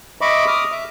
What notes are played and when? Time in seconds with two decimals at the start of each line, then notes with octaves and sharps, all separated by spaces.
0.21 D#5 E5 B5 C#6 D6
0.48 D6 D#6 F6
0.72 E5